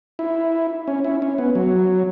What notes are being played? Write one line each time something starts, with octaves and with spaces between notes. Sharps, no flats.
E4
C#4
E4
C#4
B3
F#3